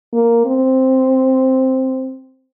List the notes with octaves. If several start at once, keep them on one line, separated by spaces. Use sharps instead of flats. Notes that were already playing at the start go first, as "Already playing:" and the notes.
A#3
C4